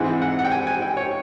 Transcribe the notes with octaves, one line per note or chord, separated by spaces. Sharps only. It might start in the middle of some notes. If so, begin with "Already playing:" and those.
Already playing: G#2 E3 G#3 C4 E4 F#5
F#5
F#5
G5
G#5
G#5
G5
C#5